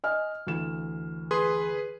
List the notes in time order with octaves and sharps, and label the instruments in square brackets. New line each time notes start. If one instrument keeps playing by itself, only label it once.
[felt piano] D#5 G#5 F6
D2 E3 E7
[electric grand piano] G#4 B4 C6